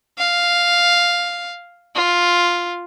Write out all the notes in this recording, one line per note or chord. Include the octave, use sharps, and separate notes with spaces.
F5
F4